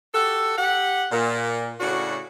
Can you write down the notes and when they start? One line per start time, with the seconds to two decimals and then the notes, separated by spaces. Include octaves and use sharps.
0.14 F#4 G4 A4
0.58 G4 F#5
1.12 A#2
1.80 A2 C#3 D4 F#4